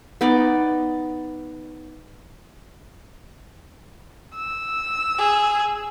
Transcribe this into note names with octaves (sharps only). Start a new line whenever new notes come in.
B3 D#4 D5
E6
G#4